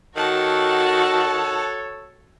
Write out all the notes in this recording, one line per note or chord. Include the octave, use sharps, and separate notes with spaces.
D#3 F#4 A4 C#5 F#5 A5